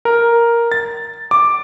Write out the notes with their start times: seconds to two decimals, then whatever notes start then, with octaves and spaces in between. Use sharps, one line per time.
0.05 A#4
0.72 A6
1.31 D6